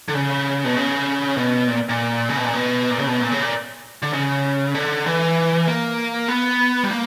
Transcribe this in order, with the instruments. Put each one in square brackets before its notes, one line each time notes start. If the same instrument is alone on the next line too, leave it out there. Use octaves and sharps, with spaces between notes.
[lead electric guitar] D3
C#3
B2
C#3
B2
A#2
A#2
C#3
B2
A#2
B2
A#2
C#3
B2
A#2
C#3
A#2
D3
C#3
D3
E3
A#3
B3
G3
A#3